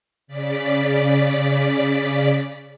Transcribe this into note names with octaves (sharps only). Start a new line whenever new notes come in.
C#3 D5 B6